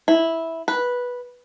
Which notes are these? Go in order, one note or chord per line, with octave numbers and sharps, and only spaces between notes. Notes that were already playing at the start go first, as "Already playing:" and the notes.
E4
B4